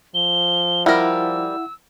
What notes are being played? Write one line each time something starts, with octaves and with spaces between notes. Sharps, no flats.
F3 G7
G3 E4 A#4 F#5 E6